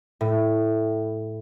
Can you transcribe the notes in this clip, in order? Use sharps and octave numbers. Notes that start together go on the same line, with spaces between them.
A2